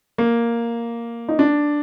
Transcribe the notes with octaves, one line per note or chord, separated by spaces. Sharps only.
A#3
D#4
D4